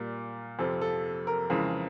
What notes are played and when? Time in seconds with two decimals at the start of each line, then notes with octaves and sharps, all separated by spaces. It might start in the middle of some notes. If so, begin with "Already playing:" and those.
Already playing: A#2 G3 A#4
0.59 F2 C3 F3 A4
0.81 A4
1.27 A#4
1.50 F2 C#3 E3 G#3